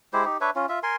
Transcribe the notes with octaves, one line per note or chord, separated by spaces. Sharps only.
G#3 E4 G4 C5
D#4 G4
D4 B4 C#5 E5
C#4 F4
F4 E5
A#4 G#5 C6